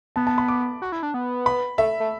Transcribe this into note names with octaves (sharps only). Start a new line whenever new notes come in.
B3 A5
A5
B5
D6
F#4
E4
D4
B3
B5
A3 E5
A3